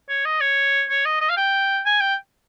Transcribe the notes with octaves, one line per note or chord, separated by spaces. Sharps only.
C#5
D#5
C#5
C#5
D#5
D#5
F5
G5
G#5
G5